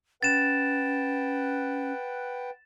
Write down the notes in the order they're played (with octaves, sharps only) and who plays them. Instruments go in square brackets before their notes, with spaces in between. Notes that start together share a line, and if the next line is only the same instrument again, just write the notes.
[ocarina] C#4 [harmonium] B4 F#5 G5 [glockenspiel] A6 E7